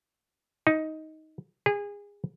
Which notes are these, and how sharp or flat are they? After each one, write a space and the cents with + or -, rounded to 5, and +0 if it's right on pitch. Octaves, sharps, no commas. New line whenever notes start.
D#4 +10
G#4 -25